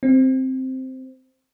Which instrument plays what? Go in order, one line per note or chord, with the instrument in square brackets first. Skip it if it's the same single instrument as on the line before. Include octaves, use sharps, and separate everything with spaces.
[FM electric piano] C4